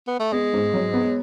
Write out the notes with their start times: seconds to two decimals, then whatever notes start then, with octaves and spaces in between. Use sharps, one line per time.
0.08 B3
0.20 A3
0.32 G#3 B3
0.54 G#2
0.74 F#3
0.94 B3